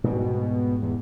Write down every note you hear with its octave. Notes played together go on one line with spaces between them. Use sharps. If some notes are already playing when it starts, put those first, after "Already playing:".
G#2 B2 G3
E2